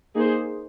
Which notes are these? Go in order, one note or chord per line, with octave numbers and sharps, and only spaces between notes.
A#3 D#4 G#4 C5